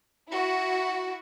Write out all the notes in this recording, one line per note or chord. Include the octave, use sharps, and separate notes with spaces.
E4 F#4